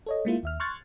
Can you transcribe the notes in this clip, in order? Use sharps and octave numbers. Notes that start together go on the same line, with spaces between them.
A4 C#5 D#5
G#3 A#3 E4 F4
D#2 E5 F6
C6 C#6 F6 F#6 G#6 A6